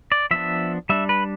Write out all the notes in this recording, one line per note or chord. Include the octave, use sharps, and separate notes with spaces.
D5
F3 B3 D4 E5
G3 D4 E5
B4